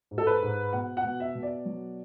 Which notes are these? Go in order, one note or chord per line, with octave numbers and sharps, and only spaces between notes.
G#2
A4
B4
G#2
B2 F#5
F#5
B2
E5
B2
D5
F#3